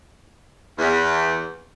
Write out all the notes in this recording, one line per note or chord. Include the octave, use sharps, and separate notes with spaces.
E2